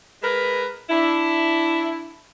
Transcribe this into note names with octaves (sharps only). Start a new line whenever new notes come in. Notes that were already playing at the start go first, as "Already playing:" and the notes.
G#3 A#4 B4
D4 E4